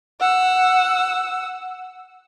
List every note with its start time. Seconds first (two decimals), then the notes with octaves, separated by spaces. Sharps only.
0.20 F#5 E6